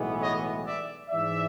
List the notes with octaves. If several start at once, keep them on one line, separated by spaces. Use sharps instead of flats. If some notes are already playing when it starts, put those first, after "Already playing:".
Already playing: B1 A2 E3 G#3 B3
C#5 D#5
D5 E5
G#2 E3 G#3 D5 E5